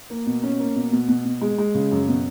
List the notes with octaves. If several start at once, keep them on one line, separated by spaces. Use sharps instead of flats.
A#3
B2
C#4
A#3
B2
B2
B2
B2
G#3
G#3
C#3
F#2
B2